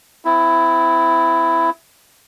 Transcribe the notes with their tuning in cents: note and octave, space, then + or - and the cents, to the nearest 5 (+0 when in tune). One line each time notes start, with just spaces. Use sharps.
C4 -35 E4 +10